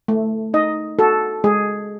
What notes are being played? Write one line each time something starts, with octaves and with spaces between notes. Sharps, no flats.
A3
D#4 D#5
F#4 A4
G#3 G#4